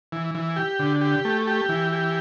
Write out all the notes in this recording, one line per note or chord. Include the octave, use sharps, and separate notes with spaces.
E3
E3
G4
D3
G4
A3
G4
E3
G4